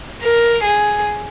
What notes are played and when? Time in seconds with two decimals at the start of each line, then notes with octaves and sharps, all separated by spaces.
0.22 A#4
0.64 G#4